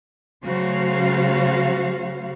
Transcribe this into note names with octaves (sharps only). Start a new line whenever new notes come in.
C#3 F#3 A3 F#4 C5 F5